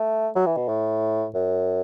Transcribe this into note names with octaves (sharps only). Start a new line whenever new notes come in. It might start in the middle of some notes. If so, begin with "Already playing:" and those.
Already playing: A3
F#3
E3
B2
A2
F#2